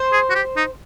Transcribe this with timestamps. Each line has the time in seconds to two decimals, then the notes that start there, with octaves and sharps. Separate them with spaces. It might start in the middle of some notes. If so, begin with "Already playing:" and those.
Already playing: C5
0.13 G#4
0.30 F#4
0.35 G4
0.57 D#4